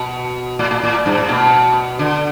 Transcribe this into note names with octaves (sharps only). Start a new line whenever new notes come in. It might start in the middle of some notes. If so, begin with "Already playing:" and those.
Already playing: B2
A2
A2
A2
G2
A2
B2
D3